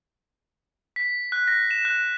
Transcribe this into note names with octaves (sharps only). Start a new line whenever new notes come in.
B6
F#6
A#6
E7
F#6